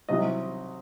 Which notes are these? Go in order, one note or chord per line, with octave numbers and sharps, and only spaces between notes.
C2 C3 F#3 D#5